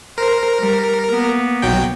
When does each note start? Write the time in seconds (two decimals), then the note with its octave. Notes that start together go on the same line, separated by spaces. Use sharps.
0.18 A#4 C5
0.60 G3
1.11 A#3 B3
1.62 B1 F#3 G5